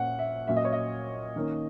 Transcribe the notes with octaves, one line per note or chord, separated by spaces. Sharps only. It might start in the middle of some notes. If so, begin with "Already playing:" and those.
Already playing: A#2 A#3 C#4 F#5
E5
A#2 F#3 C#4 E5
D#5
C#5
D#5
D#3 A#3 C#4